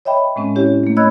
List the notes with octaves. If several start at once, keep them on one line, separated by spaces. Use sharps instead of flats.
C#5 D#5 E5 G5 B5
A2 G#3 C4 C#4
C#4 E4 G4 C#5
A3 A#3
C#5 D#5 B5 E6 F#6 G#6